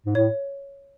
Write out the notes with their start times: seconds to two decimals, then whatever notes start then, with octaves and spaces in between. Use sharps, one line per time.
0.06 G#2
0.15 A2 C#5